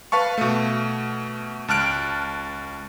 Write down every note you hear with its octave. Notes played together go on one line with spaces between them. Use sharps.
B4 F5 A5 C#6
B2 A3
C#2 A5 F6 F#6 D7